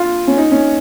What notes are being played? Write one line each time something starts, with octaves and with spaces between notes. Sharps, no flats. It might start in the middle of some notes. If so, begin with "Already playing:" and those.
Already playing: F4
C#4
D#4
C#4